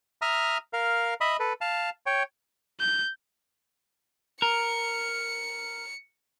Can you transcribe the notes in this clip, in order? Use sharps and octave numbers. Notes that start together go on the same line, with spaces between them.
E5 A#5 D#6 F6
A#4 F5
D#5 E5 B5 D#6
A4 B4
F5 A5
C#5 G5
G6
A#4 C#7